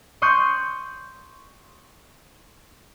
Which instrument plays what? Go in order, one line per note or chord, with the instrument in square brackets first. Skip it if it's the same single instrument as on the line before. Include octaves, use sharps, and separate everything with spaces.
[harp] C6 C#6 D#6 F#6 G6